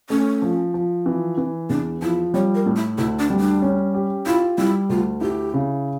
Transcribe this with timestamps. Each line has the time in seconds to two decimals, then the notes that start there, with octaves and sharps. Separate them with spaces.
0.10 A3 C#4
0.42 F3
0.74 F3
1.06 E3
1.38 E3
1.69 E2 D4
2.02 F3 E4
2.34 G3 C#5
2.55 A#4
2.66 A2
2.76 E4
2.98 D2 E4
3.19 D4
3.30 G3
3.40 D4
3.62 C#4
3.94 G4
4.26 E4 F4
4.58 G3 E4
4.89 D2 F4
5.21 E4 G4
5.54 C#3